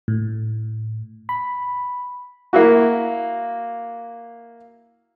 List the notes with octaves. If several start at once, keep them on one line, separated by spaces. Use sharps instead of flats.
A2
B5
A#3 E4 F#4